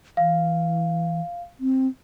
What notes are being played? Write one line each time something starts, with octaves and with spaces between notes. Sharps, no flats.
E3 F5
C4